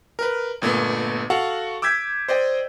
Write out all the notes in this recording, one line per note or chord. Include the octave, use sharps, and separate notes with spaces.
A#4 B4
G1 A#2 A3 B3
F#4 A4 F5 F#5
D6 E6 G6 G#6 B6
C5 D5 D#5 G5